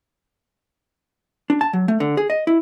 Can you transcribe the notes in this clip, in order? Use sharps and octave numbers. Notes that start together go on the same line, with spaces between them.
D4
A5
F#3
A3
D3
G#4
D#5
E4